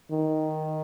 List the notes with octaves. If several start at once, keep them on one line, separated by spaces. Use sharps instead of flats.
D#3